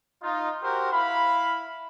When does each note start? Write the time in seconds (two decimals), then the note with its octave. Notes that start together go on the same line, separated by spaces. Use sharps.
0.23 D#4 F4
0.62 F#4 G4 A#4 C5
0.92 E4 F5 B5